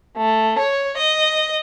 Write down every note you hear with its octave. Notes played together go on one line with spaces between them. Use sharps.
A3
C#5
D#5